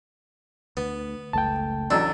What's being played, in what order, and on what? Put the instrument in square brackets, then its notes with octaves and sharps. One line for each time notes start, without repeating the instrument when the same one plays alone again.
[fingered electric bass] D2 [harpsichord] B3
[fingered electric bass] F#1 C#2 A3 [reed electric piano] G5 A5
[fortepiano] A1 F#3 E6 [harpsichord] D4